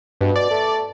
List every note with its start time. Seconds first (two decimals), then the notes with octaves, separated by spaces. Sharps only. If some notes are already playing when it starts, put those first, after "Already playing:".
0.21 G2 B2
0.36 D5
0.50 A3